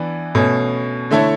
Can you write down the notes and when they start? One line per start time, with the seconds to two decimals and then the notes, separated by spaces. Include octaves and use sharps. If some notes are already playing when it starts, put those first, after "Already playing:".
Already playing: E3 B3 D4
0.35 B2 A3 C#4
1.11 D3 A3 E4 A4 C#5